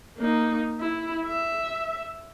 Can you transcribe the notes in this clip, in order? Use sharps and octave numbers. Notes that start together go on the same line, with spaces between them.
A#3 D#4
E4
E5